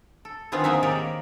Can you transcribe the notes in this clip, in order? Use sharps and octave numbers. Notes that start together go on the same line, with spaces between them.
A4
D3 D#3 B3 C4 F4 G#4
A#3 C4 D#4 G#4 E5
D#3 A#3 G4 A#4 C#5 D5